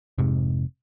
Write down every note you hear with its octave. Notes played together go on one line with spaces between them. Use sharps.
F1 G#2 C3